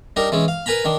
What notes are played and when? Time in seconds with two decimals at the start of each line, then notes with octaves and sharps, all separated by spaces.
0.16 G3 D4 D#4 A#4
0.32 E3 G#3 C#4
0.48 F5
0.66 A#4 B4 G#5 A#5 B5
0.85 D#3 D4